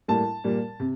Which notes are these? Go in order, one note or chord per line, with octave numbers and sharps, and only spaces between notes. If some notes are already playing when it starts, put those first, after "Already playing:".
A2 G3 A#3 A5
A#2 G3 A#3
C3